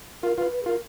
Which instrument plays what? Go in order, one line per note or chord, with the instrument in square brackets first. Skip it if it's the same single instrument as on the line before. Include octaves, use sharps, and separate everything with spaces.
[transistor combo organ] F4 [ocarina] A#4
[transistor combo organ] F4 [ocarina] B4
[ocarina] B4
G#4
[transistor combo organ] F4 [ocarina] A#4